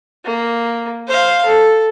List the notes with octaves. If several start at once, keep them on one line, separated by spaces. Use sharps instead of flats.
A#3
C5 F5
A4